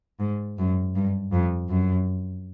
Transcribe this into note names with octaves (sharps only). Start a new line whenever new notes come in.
G#2
F#2
G2
F2
F#2